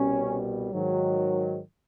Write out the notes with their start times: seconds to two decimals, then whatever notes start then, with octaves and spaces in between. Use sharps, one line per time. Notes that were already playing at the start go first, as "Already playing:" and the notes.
Already playing: C2 B2 G3 C#4
0.72 G#2 D#3 F#3